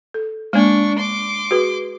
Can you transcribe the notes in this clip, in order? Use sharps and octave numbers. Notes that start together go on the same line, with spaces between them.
A4
G#3 A#3 D4 C#6
C6 D6
F#4 G#4 B4